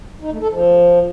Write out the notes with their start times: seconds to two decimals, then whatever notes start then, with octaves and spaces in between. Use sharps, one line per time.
0.22 D#4
0.32 A3
0.41 A4
0.51 F3